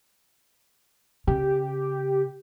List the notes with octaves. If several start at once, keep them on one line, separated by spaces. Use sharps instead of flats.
C#3 G4